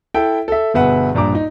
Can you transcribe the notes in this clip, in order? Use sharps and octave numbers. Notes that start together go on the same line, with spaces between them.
E4 A4 E5 G5
A4 E5
G1 B2 G#4 B4 E5 F#5
A#1 G2 A#5 D6
D#4